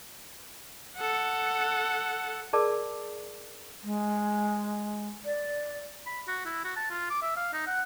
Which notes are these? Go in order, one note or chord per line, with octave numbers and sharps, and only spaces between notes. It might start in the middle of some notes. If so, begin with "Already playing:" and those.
A4 F#5
G#4 A#4 D5 A5 D6
G#3
D5
B5
F#4
E4
F#4
A5
F4
D6
E5
F5
D#4
F#5